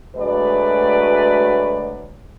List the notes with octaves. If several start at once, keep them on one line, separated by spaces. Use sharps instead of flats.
D2 F#3 G#3 A3 B4 D5